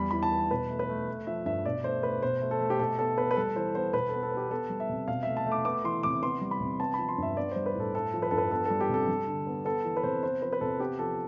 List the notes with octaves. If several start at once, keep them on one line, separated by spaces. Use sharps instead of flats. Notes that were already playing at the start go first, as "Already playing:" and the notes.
Already playing: E2 G3 B5
E3 B5
A5
B3
B2 B4
A3
B4
A3
A3
F3 E5
G2 E5
B2 D5
A3 C5
A3 B4
B2 C5
A3
A4
A3
G4
B2 A4
B3 A4
B3 B4
B4
G3 A4
E3 C5
B3 C5
B2 B4
A4
B3
A4
B3 G4
B3 A4
G3
E5
C3
B2 F5
A3 E5
A5
A3
D6
B3 D6
E3 C6
C3 D6
B3 C6
G3
B5
C3
B3 A5
F3 B5
C6
G2 E5
B3 D5
G3 C5
B4
A2 A4
A3 A4
F3
B4
G2 A4
B4
B3 A4
G3 A4
G4
C3 A4
G3
D3
B3
B3 A4
E3
B4
C3 C5
B3 C5
F3 B4
B4
C3 A4
B3 G4
F3 A4